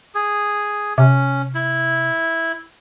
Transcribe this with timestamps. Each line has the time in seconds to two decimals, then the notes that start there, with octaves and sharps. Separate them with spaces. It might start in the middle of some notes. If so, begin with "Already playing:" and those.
0.15 G#4
0.98 C3 C#4
1.55 E4